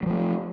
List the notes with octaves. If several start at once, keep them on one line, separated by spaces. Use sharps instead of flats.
F3 G3 A3